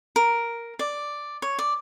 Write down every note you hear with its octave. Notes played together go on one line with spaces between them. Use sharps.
A#4
D5
C#5
D5